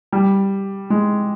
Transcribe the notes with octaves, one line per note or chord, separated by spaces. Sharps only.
G3
G#3